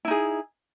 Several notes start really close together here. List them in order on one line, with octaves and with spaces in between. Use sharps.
E4 D#4 G#4